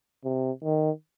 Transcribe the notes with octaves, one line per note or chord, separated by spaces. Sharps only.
C3
D#3